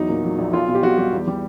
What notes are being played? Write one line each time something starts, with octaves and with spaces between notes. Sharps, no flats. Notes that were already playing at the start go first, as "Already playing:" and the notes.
Already playing: E2 F#3 D#4
A#2
F#3
A#1
B1 F4
B2
G4
B1 F#4
G3 G4
E2
G3